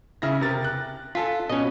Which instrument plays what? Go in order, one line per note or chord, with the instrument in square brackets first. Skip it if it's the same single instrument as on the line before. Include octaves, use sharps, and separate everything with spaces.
[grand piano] C#3 E4 A#6
C3 A#4 A6
F#6
[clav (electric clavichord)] F4 [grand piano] A4 G#5 B6
[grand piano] B2 [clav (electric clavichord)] C#4 D#5